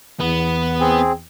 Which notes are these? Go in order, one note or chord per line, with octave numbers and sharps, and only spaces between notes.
E2 B3
C4 G#4